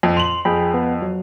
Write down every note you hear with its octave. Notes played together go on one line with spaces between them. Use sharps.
F2
C6 F7 F#7
F2 G#4 G5 B5
B3
F#3